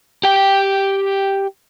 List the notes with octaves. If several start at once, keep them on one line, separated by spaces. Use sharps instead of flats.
G4 G5